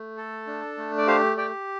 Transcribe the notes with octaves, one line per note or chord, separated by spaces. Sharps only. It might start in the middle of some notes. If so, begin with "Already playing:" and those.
Already playing: A3
A4
D4
A3
D5
G4 C5 F5
G4 D5 G5